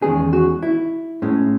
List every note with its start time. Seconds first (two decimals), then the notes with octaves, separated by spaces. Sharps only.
0.02 E2 D#3 G#3 C#4 G#4
0.33 F#4
0.63 E4
1.22 A2 G#3 C#4